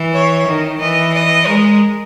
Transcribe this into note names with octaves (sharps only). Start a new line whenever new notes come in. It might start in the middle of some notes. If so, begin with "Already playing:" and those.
Already playing: E3
C#5
D#3
E3 D#5
D#5
G#3 A#4